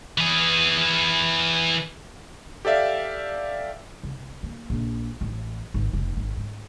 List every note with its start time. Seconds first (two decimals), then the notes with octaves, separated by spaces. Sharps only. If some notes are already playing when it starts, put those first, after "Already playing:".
0.18 E3 G#4
2.65 G4 A4 D5 E5 F5
4.04 C2
4.43 A#3
4.70 A#1
5.21 A1
5.74 G#1
5.93 F1
6.17 G#1
6.37 G#2